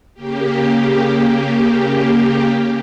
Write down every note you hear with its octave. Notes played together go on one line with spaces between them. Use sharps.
C#3 A#3 G4